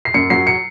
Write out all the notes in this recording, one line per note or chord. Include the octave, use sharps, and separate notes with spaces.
C7
F#2 C#7
F#3 C7
C#7